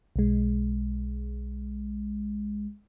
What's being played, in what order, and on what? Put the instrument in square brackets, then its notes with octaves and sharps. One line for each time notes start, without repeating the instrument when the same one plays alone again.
[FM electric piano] B1 G#3